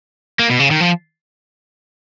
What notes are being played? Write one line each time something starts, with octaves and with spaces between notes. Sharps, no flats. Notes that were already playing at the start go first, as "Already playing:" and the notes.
A#3
B2
C#3
D#3
F3